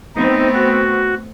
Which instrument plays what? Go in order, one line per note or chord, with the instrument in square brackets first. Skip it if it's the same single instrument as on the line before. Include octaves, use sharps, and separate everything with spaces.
[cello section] A3 B3 C4 [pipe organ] D#4
[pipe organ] F#4